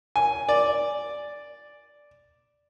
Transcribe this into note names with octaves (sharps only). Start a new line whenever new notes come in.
G#5
D5